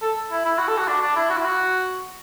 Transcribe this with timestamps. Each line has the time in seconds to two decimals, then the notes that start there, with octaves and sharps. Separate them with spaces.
0.02 A4
0.31 E4
0.45 E4
0.59 F#4
0.68 A4
0.78 F#4
0.88 D4
1.02 D4
1.16 E4
1.30 F#4
1.37 E4
1.45 F#4